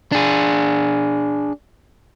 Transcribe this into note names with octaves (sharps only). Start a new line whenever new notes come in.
D4 G#4